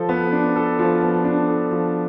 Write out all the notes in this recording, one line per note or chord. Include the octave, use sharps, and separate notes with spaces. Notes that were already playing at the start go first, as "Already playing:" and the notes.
Already playing: F3 A4
B3
D4
A4
F3
B3
D4
A4
F3